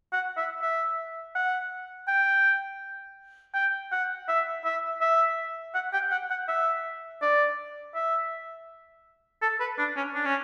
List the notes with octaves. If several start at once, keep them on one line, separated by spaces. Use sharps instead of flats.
F#5
E5
E5
F#5
G5
G5
F#5
E5
E5
E5
F#5
G5
F#5
F#5
E5
D5
E5
A4
B4
D4
C#4
D4
C#4